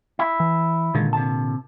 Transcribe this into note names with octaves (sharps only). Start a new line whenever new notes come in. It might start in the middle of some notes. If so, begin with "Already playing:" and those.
E4
E3
A#2 D3 D#3 G#3
C3 A5